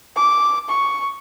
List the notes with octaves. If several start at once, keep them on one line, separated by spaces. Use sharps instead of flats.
D6
C#6